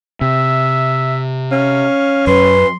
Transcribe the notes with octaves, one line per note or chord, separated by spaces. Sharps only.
C3 E5
C#4 F5
F#2 B4 C6